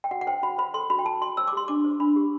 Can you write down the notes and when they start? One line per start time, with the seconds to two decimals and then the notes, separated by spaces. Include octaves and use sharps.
0.04 G5
0.11 F#4 F#5
0.21 F#5
0.27 C5 G5
0.43 F#4 B5
0.58 C5 B5
0.74 A4 C6
0.90 F#4 B5
0.99 G5
1.05 F#4 A5
1.21 F#4 C6
1.37 C5 E6
1.48 D6
1.53 G4 C6
1.68 D4 D6
1.84 C5
2.00 D4 B5
2.16 G4